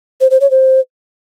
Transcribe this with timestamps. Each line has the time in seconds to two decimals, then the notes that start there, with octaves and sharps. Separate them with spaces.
0.21 C5
0.31 C5
0.41 C#5
0.51 C5